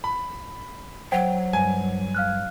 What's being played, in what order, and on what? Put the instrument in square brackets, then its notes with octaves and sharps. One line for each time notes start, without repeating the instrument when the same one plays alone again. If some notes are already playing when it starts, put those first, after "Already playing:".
[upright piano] B5
[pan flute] F#3 [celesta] C5 F#5 [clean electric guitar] G5
[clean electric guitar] G2 [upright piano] G#5
[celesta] F5 F6 F#6